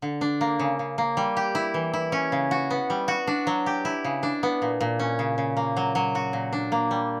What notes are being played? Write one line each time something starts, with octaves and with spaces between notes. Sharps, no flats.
D3
D4
A#3
C#3
C#3
A#3
G3
G4
E4
E3
E4
C#4
C#3
F#4
B3
G3
F#4
D4
F#3
G4
E4
C#3
D4
B3
A#2
A#2
C#4
C#3
C#3
A#3
F#3
F#3
F#4
A#2
D4
A#3
G3